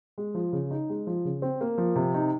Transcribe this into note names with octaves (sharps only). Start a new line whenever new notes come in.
G#3
F3
C#3
D#4
G#3
F3
C#3
C4
A#3
F3
C3
D#4